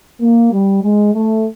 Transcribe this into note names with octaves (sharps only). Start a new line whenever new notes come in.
A#3
G3
G#3
A3